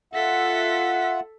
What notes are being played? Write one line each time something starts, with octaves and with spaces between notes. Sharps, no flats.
F4 A4 E5 F#5 B6